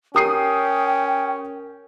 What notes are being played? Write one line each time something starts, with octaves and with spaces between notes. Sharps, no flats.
C#4 G4 A#4 G5 D#6 G6 C7